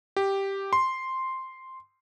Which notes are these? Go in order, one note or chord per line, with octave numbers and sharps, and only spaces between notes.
G4
C6